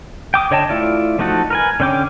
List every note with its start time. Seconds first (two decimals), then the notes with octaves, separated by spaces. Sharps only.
0.34 G5 D6 D#6
0.51 D3 C#5 D#5 G5 A5
0.69 A3 E4 F4 D5
1.19 F3 A3 D#4 F#4 A4
1.50 A#4 B4 G#5
1.80 D3 C#4 G5 D6